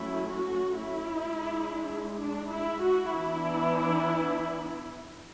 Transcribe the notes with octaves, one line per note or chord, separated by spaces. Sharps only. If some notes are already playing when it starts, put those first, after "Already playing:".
Already playing: F#3 A3 C#4 E4
F#4
E4
G#3 D4
D4
E4
F#4
E3 B3 D4 E4